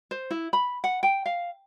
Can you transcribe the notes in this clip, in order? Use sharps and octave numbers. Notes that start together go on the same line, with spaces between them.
C5
E4
B5
F#5
G5
F5